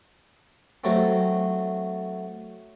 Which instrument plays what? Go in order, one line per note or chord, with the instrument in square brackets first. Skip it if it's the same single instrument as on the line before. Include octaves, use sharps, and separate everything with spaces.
[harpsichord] F#3 A3 C4